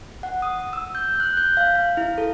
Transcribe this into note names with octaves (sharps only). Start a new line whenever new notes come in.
F#5
D#6
E6
G6
F#6
G6
F5
F5
E4
A4